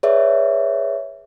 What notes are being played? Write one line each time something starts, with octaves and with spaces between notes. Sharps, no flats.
G#4 B4 C#5 D5 E5